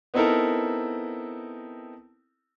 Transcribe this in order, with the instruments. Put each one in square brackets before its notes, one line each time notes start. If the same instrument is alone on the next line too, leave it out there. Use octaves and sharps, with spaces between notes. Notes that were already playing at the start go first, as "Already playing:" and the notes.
[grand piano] B3 C4 D#4 E4 A4 A#4